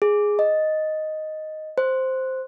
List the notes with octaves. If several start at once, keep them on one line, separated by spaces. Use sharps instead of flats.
G#4
D#5
C5